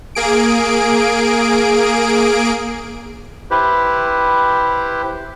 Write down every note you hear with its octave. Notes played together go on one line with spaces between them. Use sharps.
A#3 G#4 D7
E4 G4 B4 C5